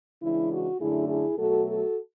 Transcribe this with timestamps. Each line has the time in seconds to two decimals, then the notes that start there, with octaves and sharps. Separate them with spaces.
0.22 C#3 E3 G#3 D4 E4
0.52 F#4
0.79 F#2 D3 A3 D4 E4 G#4
1.08 E4 G#4
1.37 B2 F#3 A3 F#4 A4
1.66 F#4 A4